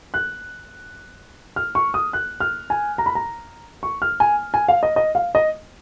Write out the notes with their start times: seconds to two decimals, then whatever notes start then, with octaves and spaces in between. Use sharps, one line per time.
0.14 F#6
1.56 F6
1.75 C#6
1.94 D#6
2.13 F#6
2.40 F6
2.70 G#5
2.98 A#5
3.06 B5
3.15 A#5
3.83 C#6
4.02 F6
4.20 G#5
4.54 G#5
4.69 F5
4.83 D#5
4.96 D#5
5.15 F5
5.35 D#5